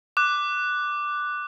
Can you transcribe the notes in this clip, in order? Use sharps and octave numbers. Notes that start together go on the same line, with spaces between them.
D6 F#6